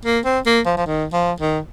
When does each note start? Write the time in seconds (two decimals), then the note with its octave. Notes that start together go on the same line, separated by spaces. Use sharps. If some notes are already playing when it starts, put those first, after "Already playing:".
0.05 A#3
0.25 C4
0.46 A#3
0.66 F3
0.77 F3
0.87 D#3
1.13 F3
1.40 D#3